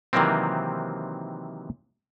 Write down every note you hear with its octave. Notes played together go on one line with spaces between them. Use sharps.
C3 D#3 E3 F#3 A#3 C4